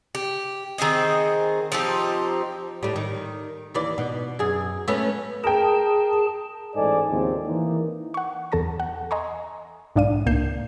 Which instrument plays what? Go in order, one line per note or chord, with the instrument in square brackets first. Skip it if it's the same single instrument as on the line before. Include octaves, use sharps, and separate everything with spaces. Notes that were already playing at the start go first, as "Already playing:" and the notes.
[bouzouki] G4
D#3 C4 G#4 D#5
F3 C4 D#4 G4
[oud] A2 G3
D#3
D#2 E3 D5
B2
F#2 G#4
A3 B3 C#4
[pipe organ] G#4 A5 [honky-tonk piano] A#4 G5
[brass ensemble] A1 G#2 A4 D5 D#5 G#5
D#2 A2 C#3 F3 G#3 C4
E3 A#3 D#4
[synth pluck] F#5 C#6
E2 A4 A5 A#6
F#5
D#5 G#5 A#5 C6 C#6
B1 G#2 D4 D5 F5 D#7
C#2 A2 A#3 G6 C7 E7